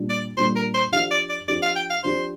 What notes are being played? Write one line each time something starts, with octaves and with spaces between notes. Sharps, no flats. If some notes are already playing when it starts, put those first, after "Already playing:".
Already playing: A#2 G3 D4
D5
A#2 G3 D4 C5
A#4
C5
F3 D4 G4 F5
D5
D5
F3 D4 G4 D5
F5
G5
F5
F3 D4 G4 C5